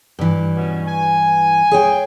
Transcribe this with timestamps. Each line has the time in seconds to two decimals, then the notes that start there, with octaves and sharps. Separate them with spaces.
0.19 G2 E3
0.56 B2 C#4
0.88 G#5
1.71 G#4 C#5 G5